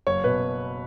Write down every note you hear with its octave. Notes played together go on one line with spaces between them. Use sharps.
F#1 C#5
B2 B4